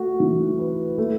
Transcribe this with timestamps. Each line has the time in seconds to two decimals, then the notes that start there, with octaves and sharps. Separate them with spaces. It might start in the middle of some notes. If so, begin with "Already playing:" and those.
Already playing: A3 F#4
0.20 E3
0.59 B4
0.98 A3